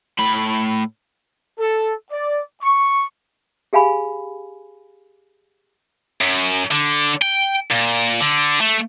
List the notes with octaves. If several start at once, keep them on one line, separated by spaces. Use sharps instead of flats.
A2 B5
A4
D5
C#6
G4 G#4 F5 G#5 B5
F#2
D3
G5
A#2
D3
A3